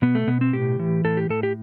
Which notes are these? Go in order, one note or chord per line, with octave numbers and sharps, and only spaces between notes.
B2 B3
A3
B2 B3
C4
A2 G4
E3
A2 A4
G4
A2 A4
G4